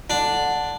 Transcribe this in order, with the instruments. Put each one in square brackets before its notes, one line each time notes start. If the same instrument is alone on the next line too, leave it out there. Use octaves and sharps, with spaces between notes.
[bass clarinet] D3 [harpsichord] D4